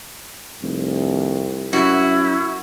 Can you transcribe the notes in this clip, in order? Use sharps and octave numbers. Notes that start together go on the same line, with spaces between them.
F1 C2
F#2 E4 F#4